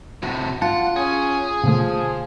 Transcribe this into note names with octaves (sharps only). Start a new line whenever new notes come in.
A2 C3 F#4
F4 F#5 A5
C#4 G#4
B2 D3 F3 A3